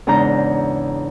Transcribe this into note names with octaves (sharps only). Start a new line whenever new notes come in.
E2 G#2 C#3 D4 A#5 G6